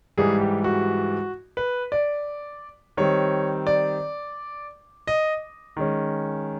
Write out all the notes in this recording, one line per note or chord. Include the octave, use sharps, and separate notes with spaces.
G#2 E3 G3 G#4
G4
F#4
B4
D5
D#3 G3 C4 C#5
D5
D#5
D#3 G#3 C#4